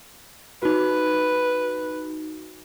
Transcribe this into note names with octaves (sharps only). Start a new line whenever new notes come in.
D#4 F#4 B4